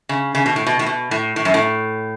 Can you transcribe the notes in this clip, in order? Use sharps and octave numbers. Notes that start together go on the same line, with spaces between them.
C#3
C#3
B2
A2
B2
A2
B2
A2
A2
F#2
A2